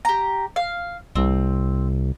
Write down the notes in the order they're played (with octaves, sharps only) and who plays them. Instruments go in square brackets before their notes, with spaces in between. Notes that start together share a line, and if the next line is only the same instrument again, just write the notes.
[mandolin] G4 A#5
F5
[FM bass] C2 [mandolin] C4